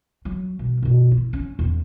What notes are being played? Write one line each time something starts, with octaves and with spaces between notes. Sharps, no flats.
F#3
B2 G3
F#2 B2
E4
C#4
E2 A2